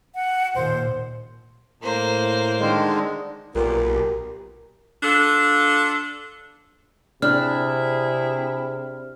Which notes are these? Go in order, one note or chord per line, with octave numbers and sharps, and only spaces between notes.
F#5
D#2 A#2 C5
A2 A#3 C5
D3 D#3 G#3
B1 A#2 B3 G4 A#4
D4 F4 A4
C3 D4 E4 G#4 F6